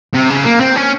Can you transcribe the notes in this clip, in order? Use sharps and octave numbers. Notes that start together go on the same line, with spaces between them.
C3
C#3
A#3
C4
C#4